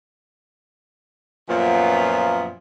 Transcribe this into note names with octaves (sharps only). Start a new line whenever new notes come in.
F#2 A#2 F3 B3 C#4 F4